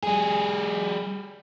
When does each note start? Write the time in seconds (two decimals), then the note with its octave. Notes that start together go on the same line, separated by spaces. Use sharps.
0.03 G3 G#4